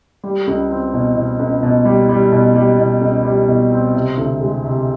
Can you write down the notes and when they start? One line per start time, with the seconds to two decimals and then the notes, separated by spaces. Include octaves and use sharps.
0.24 G3
0.47 C#2
0.70 C4
0.94 B2
1.16 B2
1.39 C#2
1.63 B2
1.85 G3
2.09 G3
2.32 B2
2.55 G3
2.79 B2
3.01 C#2
3.25 G3
3.48 B2
3.71 C4
3.95 C3
4.17 D2
4.40 G#3
4.64 C3